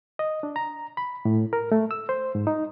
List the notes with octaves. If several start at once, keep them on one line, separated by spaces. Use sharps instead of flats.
D#5
D4
A#5
B5
A2
A#4
A3
E6
C5
G#2
D#4